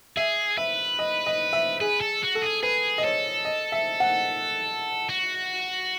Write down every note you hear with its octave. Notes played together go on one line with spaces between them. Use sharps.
G#4 E5
B4 E5
D#5
D#5
E5
G#4 B4
A4
F#4
A4
G#4
G#4 B4
D#5
A4 C#5
D#5
E5
F#5
F#4